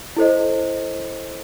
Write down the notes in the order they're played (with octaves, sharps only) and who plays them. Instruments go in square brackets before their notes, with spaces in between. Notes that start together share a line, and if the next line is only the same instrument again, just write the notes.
[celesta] E4 A4 C5 D#5